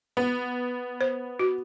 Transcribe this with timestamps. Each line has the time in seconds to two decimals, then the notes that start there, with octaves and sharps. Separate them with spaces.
0.17 B3
1.01 C5
1.39 F#4